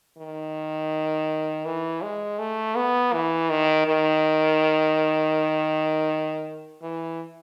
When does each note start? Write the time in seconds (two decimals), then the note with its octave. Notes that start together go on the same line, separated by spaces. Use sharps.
0.18 D#3
1.65 E3
2.02 G#3
2.39 A3
2.76 B3
3.13 E3
3.50 D#3
3.87 D#3
6.82 E3